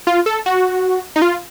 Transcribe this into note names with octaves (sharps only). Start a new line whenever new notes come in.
F4
A4
F#4
D#4
F4